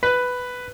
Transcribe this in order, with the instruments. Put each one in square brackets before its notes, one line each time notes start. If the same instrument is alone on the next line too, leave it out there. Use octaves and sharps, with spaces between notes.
[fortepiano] B4